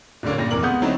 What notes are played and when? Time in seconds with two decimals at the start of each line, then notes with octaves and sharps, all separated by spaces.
0.23 D1 A#2 D3 A#3 C#4
0.38 G2 A#2 A#6
0.51 F1 E3 A#4 D6 F#7
0.63 C#2 B3 F#5 D#6 G6
0.82 D3 F#3 A3 C4 D#4 E4